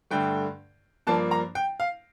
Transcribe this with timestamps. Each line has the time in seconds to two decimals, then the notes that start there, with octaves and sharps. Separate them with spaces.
0.11 G2 D3 A3 G5
1.07 G2 F3 A#3 D4 A5
1.31 A#5
1.55 G5
1.80 F5